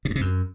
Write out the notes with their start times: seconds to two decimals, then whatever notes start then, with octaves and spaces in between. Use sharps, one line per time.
0.05 B2
0.10 G2
0.16 C3
0.21 F#2